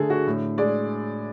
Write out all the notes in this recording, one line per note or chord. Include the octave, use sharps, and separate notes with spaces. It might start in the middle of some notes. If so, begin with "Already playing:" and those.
Already playing: D3 A3 G#4 A4
F#4
A2
G#3 D5